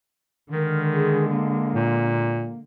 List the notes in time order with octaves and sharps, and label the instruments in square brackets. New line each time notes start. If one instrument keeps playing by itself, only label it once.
[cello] D3 G#3 [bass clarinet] D#3 [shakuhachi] A#4
[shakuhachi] G#4
A#3
[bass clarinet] A#2